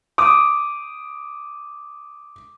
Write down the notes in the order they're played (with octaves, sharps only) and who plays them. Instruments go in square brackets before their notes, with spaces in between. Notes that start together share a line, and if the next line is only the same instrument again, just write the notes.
[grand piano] D6 D#6